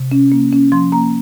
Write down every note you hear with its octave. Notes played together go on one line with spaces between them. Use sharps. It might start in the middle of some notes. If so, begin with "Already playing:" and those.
Already playing: C3
C#4
A#3
C#4
F3 C6
A#3 A#5